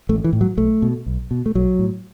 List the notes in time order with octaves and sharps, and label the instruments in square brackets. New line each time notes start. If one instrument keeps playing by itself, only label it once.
[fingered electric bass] A1 A3
E3
A2
F#3
B1 A3
B2
B1
B2
A3
B1 F#3
A2